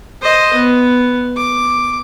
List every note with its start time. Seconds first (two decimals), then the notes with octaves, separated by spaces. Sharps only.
0.22 C5 D#5
0.54 B3
1.37 D6